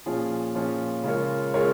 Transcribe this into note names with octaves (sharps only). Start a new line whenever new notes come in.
A#2 F3 C#4 F4 G#4
A#2 F3 C#4 F4 G#4
C#3 G#3 F4 A#4 C#5
C#3 G#3 F4 A#4 C#5